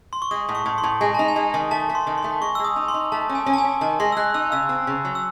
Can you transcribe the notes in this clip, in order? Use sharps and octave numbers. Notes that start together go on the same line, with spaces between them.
C6
C#6
G#3 D#6
A2
C#6
A2
C6
A2
G#3 G#5
D#4 A5
G#5
G#3
D#3
A3 A5
A3
C6
D#3
C6
A3
G#3 C#6
E6
G#3
D#6
D#4
C6
D#4
A3 A5
C#4
G#5
C#4
A5
G#5
C#4
D#3 A5
G#3 C6
E6
G#3 F#6
D#4 E6
C#3 E6
C4
C#3
F#3
E6